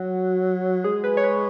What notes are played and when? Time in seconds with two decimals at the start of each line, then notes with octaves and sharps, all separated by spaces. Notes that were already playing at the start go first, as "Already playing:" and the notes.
Already playing: F#3 F#4
0.84 G#3 G#4
1.04 B4
1.17 C#5
1.24 B4